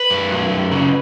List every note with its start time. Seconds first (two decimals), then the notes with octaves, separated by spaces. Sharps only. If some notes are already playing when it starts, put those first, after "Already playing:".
Already playing: B4
0.10 F#2
0.31 F#3
0.51 F#2
0.72 C#3